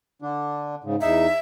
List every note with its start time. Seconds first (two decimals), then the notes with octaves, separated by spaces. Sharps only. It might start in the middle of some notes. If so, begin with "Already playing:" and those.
0.22 D3 D4
0.84 G#2 C#3
1.01 E2 D#4 E5